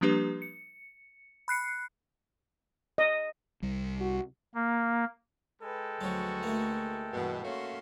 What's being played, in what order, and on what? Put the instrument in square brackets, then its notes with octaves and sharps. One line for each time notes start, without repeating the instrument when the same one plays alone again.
[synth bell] F3 G3 A#3 D4 G4 B4
C#7
B5 F#6 C7 C#7
[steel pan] D#5
[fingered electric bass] C2 G3
[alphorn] F#4
[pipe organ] A#3
[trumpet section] G#3 A4 G5 [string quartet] B4
[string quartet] D2 F#4 B4 [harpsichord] F3 F#3
[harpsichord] A3 A#3
[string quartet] G2 E3 [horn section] B2
[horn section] A3 A#3 C#4 [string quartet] F#4 F5 C6